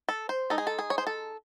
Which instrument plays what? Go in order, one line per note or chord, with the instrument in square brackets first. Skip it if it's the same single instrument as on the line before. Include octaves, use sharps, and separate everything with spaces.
[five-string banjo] A4
C5
G#3 D#4 A4
G#4
A4
G#4
C#5
C5
A4